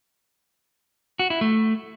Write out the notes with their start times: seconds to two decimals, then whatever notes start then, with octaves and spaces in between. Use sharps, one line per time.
1.19 F#4
1.30 E4
1.41 A3